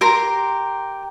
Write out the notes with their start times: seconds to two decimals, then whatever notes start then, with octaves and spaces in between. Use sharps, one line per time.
0.01 G4 A#4 A#5 C6